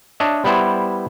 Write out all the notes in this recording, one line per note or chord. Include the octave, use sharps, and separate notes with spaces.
D4 C#5 D#5 E5
G3 B3 E4 C5